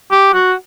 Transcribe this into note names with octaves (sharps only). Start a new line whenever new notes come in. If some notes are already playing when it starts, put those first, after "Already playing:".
G4
F#4